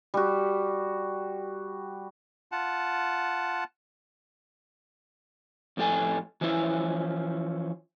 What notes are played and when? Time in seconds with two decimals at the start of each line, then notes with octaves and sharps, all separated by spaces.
0.14 G3 F#4
2.52 F4 F#5 A5
5.77 F2 A2 G4 A4 G#5
6.41 E3 F3 C#4 E4 F4